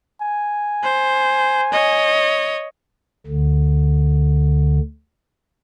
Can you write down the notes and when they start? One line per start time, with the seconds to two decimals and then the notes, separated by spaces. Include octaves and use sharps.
0.22 G#5
0.83 C5
1.72 C#5 D#5
3.27 D2 D3